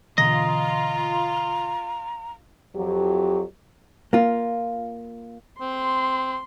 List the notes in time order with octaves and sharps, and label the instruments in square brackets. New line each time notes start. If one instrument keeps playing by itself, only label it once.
[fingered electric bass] B2 D3 E3 [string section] F4 [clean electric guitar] D#5 [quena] A#5
[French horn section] F2 F#3 G4
[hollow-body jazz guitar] A#3 F4
[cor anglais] C4 [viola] C6